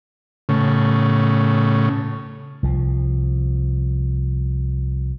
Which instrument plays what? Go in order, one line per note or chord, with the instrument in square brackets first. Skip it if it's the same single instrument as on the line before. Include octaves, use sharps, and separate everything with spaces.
[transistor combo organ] A2 C#3
[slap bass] C2 F3